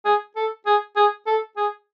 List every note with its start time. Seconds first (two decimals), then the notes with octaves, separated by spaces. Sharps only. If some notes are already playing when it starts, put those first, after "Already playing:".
0.05 G#4
0.36 A4
0.66 G#4
0.96 G#4
1.27 A4
1.57 G#4